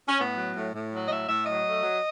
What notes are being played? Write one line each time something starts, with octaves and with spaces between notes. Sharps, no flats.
C#4
A2 B3
F#3
A2
A2
F#3
D#5
A2 E5
A2 E5
F#3 D#5
A3
F#3